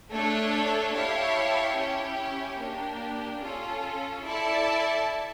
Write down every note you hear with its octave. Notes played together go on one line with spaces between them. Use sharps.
A3 D4 A4 C#5
E4 G4 C#5 F5 A5
C#4 E4 G4 C#5
A#3 D4 G4
C#4 F4 A4
E4 A4 D5 A5